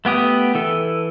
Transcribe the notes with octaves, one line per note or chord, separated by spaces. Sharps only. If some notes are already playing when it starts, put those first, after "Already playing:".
A3 B3 G4 D#6
E3 A4